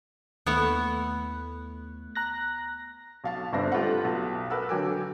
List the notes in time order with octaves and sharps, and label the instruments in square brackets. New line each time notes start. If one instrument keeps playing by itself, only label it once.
[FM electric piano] D#2 A3 F#6 [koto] B3 E4 C#5
[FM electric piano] A#5 F#6 A#6
[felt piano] B1 F5 A5
G1 C3 D4 C5 E5 A#6
A3 F4 G4 A4 B4 F#5
B1
A#4 B4 F#5 E6
D3 F#3 G5 G#5 D6